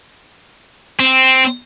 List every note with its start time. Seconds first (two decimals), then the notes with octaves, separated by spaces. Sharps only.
1.00 C4